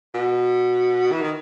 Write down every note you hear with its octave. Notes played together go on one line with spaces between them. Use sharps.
B2
E3
D#3